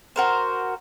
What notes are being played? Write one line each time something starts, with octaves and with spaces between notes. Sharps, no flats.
F#4 A#4 C5